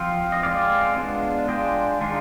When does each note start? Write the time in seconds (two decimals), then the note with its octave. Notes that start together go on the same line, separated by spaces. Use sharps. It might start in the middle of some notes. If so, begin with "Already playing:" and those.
Already playing: F3 C4 F4
0.32 D#5
0.43 G#3 C4 F4 D5 F5
0.96 G#3 B3 D4 F4
1.48 G#3 D4 F4 D#5 G5
2.01 D#3 G#3 D4 F4